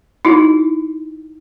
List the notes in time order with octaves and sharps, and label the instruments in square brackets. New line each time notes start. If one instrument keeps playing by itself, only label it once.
[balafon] D#4 E4 F#4